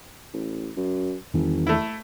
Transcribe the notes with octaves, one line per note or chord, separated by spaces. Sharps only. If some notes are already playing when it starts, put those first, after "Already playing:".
A1
F#2
G1 E2 D#3 E3
A3 E4